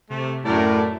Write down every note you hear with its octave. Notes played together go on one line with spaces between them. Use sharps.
C3 A3
F#2 A2 A3 A#4 D5